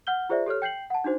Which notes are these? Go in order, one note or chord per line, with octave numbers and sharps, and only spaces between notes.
F#5 F6 G6 G7
F4 G#4 C5 D5 E5
G4 A4 C#5 F6
G5 G6 C7 F#7
F#5 A5
D4 D#4 F#4 C5